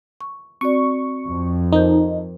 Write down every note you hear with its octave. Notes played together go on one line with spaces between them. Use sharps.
C#6
C4 F#4 D5 C#6
F2
D#4 A#4 C5 G6